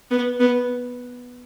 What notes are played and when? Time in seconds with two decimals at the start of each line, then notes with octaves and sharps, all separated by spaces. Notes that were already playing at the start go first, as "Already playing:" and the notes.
0.11 B3
0.40 B3